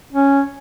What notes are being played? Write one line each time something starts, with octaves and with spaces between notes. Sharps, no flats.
C#4